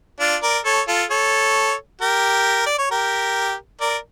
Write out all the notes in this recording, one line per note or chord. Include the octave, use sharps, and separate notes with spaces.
D4 F4
A#4 D5
A4 C#5
F4 A4
A4 C#5
G4 A#4
D5
C#5
G4 A#4
A#4 D5